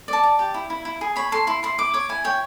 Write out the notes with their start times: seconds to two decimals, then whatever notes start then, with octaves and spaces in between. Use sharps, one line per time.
0.08 D5 A5
0.24 D5
0.39 G4
0.54 E4
0.70 E4
0.85 E4
1.01 G#4
1.16 C#5 B5
1.32 A4 C6
1.47 E4 C6
1.63 E4 C6
1.78 E4 D6
1.94 C#5 D6
2.09 E4 G#5
2.24 C#5 G5